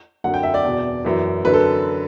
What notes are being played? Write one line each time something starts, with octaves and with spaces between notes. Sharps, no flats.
F#2 D3 F#5
G5
E5
D5
E2 B2
F#2 E3
F#2 D3 B4
A4